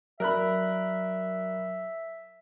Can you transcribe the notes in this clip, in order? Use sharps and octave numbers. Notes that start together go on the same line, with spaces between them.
F#3 A#4 D5 E5 B5 F#6